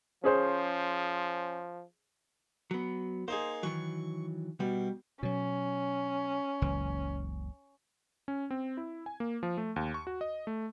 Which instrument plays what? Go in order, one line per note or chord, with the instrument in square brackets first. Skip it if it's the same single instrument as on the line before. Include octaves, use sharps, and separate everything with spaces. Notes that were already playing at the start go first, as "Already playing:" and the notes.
[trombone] F3 [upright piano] C#4 G#4 C5
[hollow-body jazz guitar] F#3 B3
[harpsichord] A#3 D#4 G#4 [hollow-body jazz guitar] C5
[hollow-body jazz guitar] D#3 E3 F#3 [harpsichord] C#6
[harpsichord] B2 [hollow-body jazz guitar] G3
[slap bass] B2 F#3 [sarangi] C#4
[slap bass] F#1 C#2 E3
[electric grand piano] C#4
C4
E4
G#5
A#3
F3
A3
D#2
C#6
F#4
D#5
A3